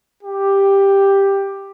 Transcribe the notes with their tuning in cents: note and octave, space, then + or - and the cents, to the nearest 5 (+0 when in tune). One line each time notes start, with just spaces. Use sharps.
G4 +5